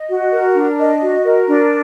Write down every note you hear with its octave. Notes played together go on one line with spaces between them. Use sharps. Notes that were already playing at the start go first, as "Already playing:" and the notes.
Already playing: D#5
F#4
A#4
D4
D#5
F#4
A#4
D4